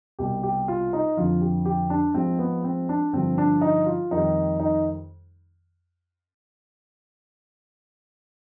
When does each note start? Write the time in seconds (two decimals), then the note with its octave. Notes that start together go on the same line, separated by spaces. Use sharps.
0.19 C2 B2 G3 G4
0.43 G4
0.68 F4
0.93 D#4
1.17 F2 D3 F3 F4
1.41 G4
1.65 G4
1.90 D4
2.14 G#2 F3 G#3 C4
2.39 B3
2.64 C4
2.89 D4
3.13 G2 D3 F3 C4
3.38 D4
3.61 D#4
3.86 F4
4.11 F2 D#3 G3 D#4
4.60 D#4